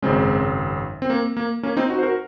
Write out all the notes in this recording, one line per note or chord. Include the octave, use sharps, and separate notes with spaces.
G#1 F#2 C#3 G#3 C4
C4
A#3
A#3
A#3 C#4
C4 D#4
D#4 F#4
C5
F#4 A#4